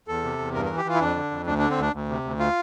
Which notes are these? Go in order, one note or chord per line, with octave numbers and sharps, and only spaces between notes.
E2 A4
C3
E2
G2 A#4
E3 A#4
G4
E3 F4
E4
F2 D4
D3
F2
D2 D4
D3 D4
C4
D2 D4
D2
C3
D2
F4